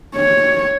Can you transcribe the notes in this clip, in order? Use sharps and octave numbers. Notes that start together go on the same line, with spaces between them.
C#5